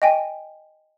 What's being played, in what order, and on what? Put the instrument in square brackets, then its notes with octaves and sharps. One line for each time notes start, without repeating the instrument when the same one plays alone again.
[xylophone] D#5 G5 G#5